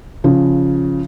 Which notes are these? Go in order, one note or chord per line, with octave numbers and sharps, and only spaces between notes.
C#3 F3